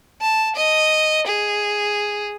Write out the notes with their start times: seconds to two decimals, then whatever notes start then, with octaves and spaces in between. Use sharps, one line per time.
0.21 A5
0.56 D#5
1.26 G#4